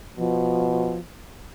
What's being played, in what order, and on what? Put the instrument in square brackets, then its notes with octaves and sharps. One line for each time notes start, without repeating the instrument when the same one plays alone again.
[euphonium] B2 [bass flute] F3